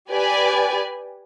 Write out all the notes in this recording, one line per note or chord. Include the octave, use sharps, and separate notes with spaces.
G4 B4 D5 G#5